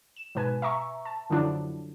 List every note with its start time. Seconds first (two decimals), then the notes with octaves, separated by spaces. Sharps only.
0.17 E7
0.35 G#2 B2 B4 G#5
0.62 E5 A#5 C#6
1.05 A5
1.30 F#2 D3 F3 F#3 D4 E4